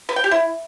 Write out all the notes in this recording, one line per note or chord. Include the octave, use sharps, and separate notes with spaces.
B4
G5
G4
E4